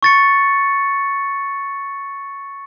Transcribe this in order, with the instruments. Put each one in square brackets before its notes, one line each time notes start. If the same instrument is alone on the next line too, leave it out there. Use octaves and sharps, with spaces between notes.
[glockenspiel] C#6 A6 C#7